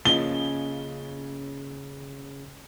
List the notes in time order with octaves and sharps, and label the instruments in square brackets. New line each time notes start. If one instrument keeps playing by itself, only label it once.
[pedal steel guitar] C#3 [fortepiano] F3 [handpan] A#3 C#4 D#5 [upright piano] G7